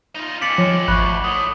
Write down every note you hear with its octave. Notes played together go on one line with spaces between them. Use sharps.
D#4 F4
G#3 C4 D6 A6 B6 C#7 F#7
F3 C#5
G#1 D2 B5 C#6 F#6
A2 D#6